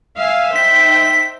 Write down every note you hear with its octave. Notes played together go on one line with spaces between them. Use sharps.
E5 F5 G#5
D#4 C5 G5 B6